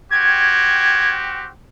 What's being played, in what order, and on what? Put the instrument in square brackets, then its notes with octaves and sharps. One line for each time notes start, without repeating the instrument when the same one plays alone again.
[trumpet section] C4 F#4 G4 [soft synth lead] G#6